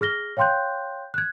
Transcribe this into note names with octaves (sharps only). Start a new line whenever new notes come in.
G#4 F6 A#6 G7
C#5 F5 G5 C6 F#6 G6
F#6 G#6